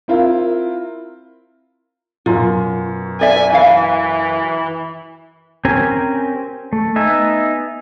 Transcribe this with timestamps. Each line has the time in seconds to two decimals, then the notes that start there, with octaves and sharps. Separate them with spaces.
0.08 C4 E4 F4 A#4
2.26 F#2 B2 F4
3.21 D5 E5 G#5
3.54 E3 F5
5.65 C4 C#4 G4 A#4 G#5
6.73 A3
6.96 B3 D#4 E5 G#5